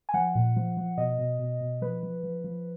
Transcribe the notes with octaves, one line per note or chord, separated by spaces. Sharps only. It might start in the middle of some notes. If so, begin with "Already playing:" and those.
G#5
F3 F#5
A#2
F3
F3
B2 D#5
B2
B2
B2
F3 B4
F3
F3
F3